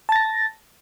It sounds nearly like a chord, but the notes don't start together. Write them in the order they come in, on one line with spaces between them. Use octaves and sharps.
A5 A6 A#6